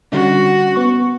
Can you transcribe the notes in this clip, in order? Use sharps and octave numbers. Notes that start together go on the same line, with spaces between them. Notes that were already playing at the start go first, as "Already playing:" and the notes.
D3 G3 C#4 F#4
B3 C#6